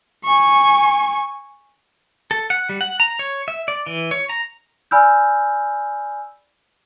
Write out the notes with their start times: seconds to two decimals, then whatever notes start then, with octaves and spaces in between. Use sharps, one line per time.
0.25 G#5 C#6
2.31 A4
2.50 F#5
2.69 G3
2.81 F#5
3.00 A#5
3.19 C#5
3.48 E5
3.68 D5
3.87 E3
4.11 C#5
4.29 A#5
4.91 D5 G#5 B5 E6 F6 G6